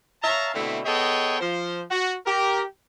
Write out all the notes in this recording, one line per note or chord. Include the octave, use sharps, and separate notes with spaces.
C#5 E5 F5 A5 A#5
B2 D3 A3 C4 E4
B3 G#4 A4 C#5 D#5 G5
F3 C5
F#4
G4 A#4